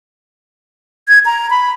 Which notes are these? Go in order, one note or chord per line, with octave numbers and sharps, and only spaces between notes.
G#6
A#5
B5